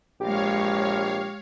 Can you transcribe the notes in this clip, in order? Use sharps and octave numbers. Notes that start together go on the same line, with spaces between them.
A#1 G#3 G4 C#5 F5